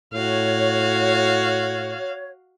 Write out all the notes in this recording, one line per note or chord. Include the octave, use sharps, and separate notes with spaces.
A2 F#4 C#5 F5